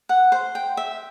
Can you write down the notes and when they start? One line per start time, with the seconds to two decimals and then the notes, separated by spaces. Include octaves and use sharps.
0.09 F#5
0.32 C5
0.55 G5
0.77 E5